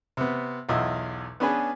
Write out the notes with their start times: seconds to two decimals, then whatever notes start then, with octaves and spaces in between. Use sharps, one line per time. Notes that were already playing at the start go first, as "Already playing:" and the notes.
0.17 C3 B3
0.69 B1 E2 F4 D#5 E5
1.40 B3 C#4 D4 G#4 B4 G#5